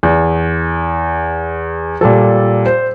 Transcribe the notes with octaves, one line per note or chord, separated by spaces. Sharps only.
E2
A#2 G3 A4
C5